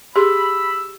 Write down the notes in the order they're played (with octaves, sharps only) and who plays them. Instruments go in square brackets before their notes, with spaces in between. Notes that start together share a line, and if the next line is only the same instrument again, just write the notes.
[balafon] G4 G#4 C6 [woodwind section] B5 E6